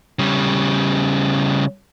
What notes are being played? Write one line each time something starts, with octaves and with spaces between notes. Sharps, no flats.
C#3 G3